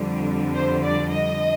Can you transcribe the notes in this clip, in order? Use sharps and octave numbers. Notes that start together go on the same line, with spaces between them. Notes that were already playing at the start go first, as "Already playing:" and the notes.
Already playing: F2 D3 G3
C5
D5
D#5